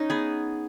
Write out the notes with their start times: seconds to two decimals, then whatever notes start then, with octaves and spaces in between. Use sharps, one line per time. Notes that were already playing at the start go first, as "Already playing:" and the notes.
Already playing: C#4 D#4
0.10 B3 G#4